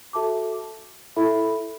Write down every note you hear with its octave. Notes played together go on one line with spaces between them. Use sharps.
F#4 A4 E5 A5 D6
E4 A4 E5 B5